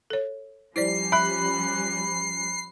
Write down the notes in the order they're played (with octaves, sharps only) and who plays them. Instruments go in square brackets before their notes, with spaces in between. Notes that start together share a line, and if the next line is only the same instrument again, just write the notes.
[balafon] A4 C#5
[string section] F3 G3 C#4 [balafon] E4 C5 D5 [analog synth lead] C7
[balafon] E5 [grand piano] B5 F#6